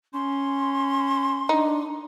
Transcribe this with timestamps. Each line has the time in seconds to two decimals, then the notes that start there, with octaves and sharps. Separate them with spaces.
0.14 C#4 C6
1.49 D4 D#4